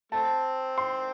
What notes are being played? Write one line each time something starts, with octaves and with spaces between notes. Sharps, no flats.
A3 C4 A5
C6